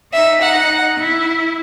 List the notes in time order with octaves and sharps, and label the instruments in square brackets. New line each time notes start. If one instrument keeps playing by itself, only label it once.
[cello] D#4 [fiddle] E5
[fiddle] F#5
[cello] E4